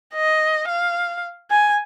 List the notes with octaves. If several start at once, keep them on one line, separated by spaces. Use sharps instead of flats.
D#5
F5
G#5